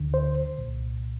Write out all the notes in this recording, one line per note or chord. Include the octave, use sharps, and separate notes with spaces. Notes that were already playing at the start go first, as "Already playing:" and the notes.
Already playing: D2 D3
C5
C2 A#2